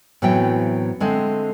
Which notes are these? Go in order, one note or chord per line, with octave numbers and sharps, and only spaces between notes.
A2 E3 F#3 B3 C4 G5
D3 G#3 A3 C4